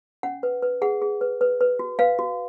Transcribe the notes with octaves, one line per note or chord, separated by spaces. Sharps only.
C#4 F#5
B4
B4
G#4 F#5
G#4
B4
B4
B4
F#4
B4 F5
F#4